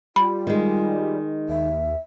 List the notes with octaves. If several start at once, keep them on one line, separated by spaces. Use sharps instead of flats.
G3 F4 B5
D#3 G#3
D#2 E5